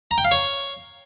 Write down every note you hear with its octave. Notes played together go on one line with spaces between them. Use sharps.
A#5
G5
F5
C#5